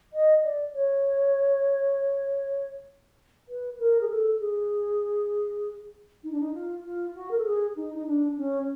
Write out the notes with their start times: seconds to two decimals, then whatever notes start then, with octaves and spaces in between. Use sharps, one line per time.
0.12 D#5
0.43 D5
0.73 C#5
3.48 B4
3.79 A#4
4.01 G#4
4.09 A4
4.40 G#4
6.23 D#4
6.32 D4
6.40 D#4
6.53 F4
6.84 F4
7.15 F#4
7.31 A#4
7.38 A4
7.45 G#4
7.76 D#4
7.94 D#4
8.06 D4
8.37 C#4